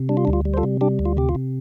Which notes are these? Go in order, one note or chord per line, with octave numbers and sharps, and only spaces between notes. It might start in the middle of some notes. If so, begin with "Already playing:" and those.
Already playing: C3
G3 D4
F4
D4
D2
F4
G3
C5
F4 A4
C3
G3 D4 G4
D2
F4
C3 G4
F4
C3